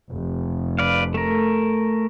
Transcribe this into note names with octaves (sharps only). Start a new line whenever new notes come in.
F1
B4 D5 F5
A3 A#4